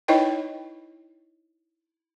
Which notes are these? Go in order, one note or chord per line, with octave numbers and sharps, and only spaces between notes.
D#4 E4 B4 C#5 D#5 G5